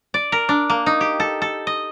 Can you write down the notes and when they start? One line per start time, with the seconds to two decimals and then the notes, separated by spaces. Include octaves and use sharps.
0.14 D5
0.32 A#4
0.49 D4
0.70 A#3
0.86 D#4
1.01 G4
1.20 A4
1.42 A4
1.67 D#5